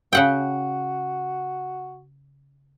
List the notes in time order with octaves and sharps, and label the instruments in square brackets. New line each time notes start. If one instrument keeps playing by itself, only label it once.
[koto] C#3 F#5 G5 [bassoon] F#4